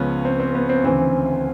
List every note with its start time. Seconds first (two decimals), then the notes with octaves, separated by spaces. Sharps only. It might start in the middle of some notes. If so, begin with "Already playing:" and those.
Already playing: C#2 C#3 F3 B3 C#4
0.25 C4
0.40 C4
0.55 B3
0.69 C4
0.84 D2 C#3 E3 C4